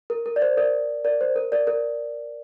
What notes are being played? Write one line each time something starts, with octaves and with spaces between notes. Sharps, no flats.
A#4
A#4
D5
C5
A#4 D5
A#4 D5
C5
A#4
A#4 D5
A#4